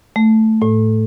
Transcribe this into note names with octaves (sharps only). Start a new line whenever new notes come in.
A3
A2